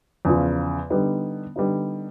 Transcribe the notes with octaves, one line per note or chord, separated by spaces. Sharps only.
E2 C#3 F3
D3 G3 B3 D#4
D3 G3 B3 D#4